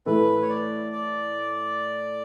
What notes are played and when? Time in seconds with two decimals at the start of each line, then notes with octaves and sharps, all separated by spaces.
0.06 A2 E3 A3 E4 A4 B4
0.42 C#5
0.49 D5
0.92 D5